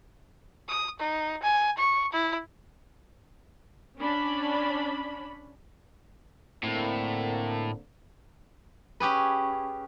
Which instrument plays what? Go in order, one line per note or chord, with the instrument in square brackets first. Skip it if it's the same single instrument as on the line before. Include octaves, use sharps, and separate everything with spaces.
[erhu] D#6
D#4
G#5
C#6
E4
[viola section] C#4 D4 B5
[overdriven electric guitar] A2 [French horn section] D3 A#3 C4
[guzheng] C#4 G4 G#4 B4